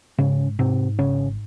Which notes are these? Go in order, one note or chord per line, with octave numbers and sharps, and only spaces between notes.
G#2 C#3 C#4
G#2 C3 C4
G#1 C#3 C#4